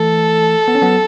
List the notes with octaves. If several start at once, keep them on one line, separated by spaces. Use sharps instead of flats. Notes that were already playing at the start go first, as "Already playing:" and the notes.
Already playing: E3 A3 A4
B3
C#4
F#3 B3